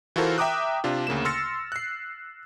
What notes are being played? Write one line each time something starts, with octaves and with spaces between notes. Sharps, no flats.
E3 F4 F#4 A4 A#4 C5
E5 G5 A#5 D6 D#6 F#6
C3 D4 F4
D2 C#3 A#3 E7
C6 E6 F6 A6 A#6 C#7
F#6 C7